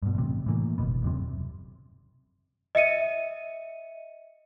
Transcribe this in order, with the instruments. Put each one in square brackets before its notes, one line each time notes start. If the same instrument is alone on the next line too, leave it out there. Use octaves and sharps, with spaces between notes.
[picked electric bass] G2 B2
A1 C3
A2 E3 A#3
F#1 F#2 B2 B3
D#1 F#2 C3 C4
[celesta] D#5 E5 C#7 D#7